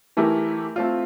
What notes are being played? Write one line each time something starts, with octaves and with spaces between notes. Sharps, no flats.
E3 A3 E4 G4 A#4
A3 C4 F4